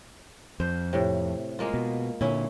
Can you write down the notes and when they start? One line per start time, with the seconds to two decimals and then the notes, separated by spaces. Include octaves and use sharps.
0.60 F2 C5
0.93 A2 C3
1.59 G#3 A#3 F4
1.74 B2
2.21 A#2 D3 C#4 E4